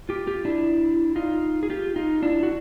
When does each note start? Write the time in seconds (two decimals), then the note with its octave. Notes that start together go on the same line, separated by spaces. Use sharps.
0.09 F4 G4
0.27 F4 G4
0.45 D4 E4
1.16 D#4 F4
1.63 G#4
1.70 F4 G4
1.96 D#4 F4
2.23 D4 E4
2.43 F#4